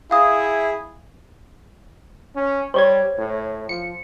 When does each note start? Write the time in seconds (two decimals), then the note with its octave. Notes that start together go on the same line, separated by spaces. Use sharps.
0.11 E4 G#4 F5 D#6
2.36 C#4
2.74 G3 C5 C#5 G#6
3.18 A2
3.69 F3 C#7